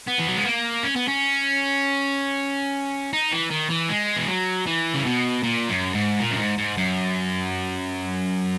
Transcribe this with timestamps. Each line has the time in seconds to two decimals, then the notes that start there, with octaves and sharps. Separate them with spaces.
0.07 B3
0.19 E3
0.28 F#3
0.36 G#3
0.45 A#3
0.83 C#4
0.96 B3
1.08 C#4
3.13 D#4
3.32 E3
3.51 D#3
3.70 E3
3.90 G#3
4.17 E3
4.28 F#3
4.66 E3
4.94 C#3
5.05 B2
5.43 A#2
5.69 F#2
5.94 G#2
6.19 A#2
6.31 F#2
6.38 G#2
6.58 G#2
6.77 F#2